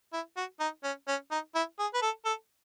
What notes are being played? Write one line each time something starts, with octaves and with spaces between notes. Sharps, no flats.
E4
F#4
D#4
C#4
C#4
D#4
E4
G#4
B4
A4
A4